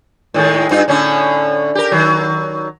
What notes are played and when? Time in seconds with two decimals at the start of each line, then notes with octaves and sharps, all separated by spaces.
0.34 A2 D#3 G#3
0.71 G2 D#4 F4
0.88 A2 D3 C#4
1.75 G4 A#4
1.92 D#3 F#3